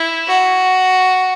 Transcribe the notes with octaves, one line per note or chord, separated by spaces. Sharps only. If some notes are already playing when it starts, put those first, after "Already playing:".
Already playing: E4
F#4